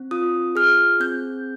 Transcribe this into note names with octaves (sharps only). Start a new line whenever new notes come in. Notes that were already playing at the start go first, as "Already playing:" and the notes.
Already playing: C4
F4 D#6
G#4 F6
C4 G6